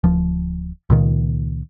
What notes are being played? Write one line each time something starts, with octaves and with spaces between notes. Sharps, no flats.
D1 F3
C#2 A#2 D#3